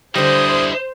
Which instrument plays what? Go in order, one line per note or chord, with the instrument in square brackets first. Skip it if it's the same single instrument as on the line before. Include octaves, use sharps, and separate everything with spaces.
[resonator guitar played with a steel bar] D3 G3 [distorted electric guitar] E4 D#5 [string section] C5 [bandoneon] D#6